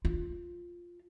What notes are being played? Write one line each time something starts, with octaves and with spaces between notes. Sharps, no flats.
F4